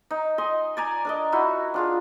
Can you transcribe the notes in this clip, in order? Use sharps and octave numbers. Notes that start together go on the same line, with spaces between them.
D#4
D#5 G#5 C6
D5 G#5 A#5
D4 A#4 D#5
D#4 E4 F#4
D4 F4 G#4